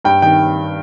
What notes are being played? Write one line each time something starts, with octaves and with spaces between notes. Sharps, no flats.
G2 G5
D#3 G5